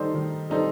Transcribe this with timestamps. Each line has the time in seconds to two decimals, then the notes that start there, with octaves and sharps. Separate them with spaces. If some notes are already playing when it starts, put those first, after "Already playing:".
Already playing: D#3 G3 D#4 A4 C5
0.14 D#3
0.50 G3 D#4 A4 C5